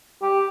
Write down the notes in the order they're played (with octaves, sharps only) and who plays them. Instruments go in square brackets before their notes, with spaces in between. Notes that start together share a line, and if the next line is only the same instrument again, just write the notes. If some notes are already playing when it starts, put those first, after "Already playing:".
[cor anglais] G4